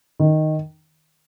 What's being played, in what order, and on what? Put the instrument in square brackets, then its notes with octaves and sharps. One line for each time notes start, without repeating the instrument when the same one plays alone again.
[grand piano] D#3